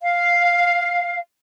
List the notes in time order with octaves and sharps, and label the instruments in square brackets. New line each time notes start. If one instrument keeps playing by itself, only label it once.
[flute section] F5